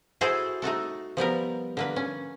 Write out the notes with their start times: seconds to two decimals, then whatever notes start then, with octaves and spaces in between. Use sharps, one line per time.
0.21 E4 F#4 G#4 A4 C5
0.62 A3 D#4 F#4 A4
1.17 F3 G3 B3 A#4
1.77 D3 A#3 B4
1.96 C#4